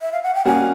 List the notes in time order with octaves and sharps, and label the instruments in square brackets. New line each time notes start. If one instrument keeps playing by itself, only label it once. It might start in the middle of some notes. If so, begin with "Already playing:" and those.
[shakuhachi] E5
F5
F#5
G5
[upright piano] G3 A#3 C#4 F#4 [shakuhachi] G#5